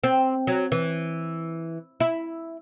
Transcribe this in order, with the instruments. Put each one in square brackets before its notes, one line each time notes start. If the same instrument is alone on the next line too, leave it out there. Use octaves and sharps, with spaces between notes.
[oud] C4
F#3
E3
E4